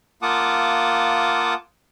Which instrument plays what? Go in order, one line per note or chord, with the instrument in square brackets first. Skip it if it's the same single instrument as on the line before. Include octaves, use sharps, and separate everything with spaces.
[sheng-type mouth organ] A#3 F4 F#5 A5 D6 D#6